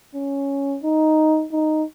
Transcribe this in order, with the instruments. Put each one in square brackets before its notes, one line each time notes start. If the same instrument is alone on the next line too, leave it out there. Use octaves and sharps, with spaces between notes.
[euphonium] C#4
D#4
D#4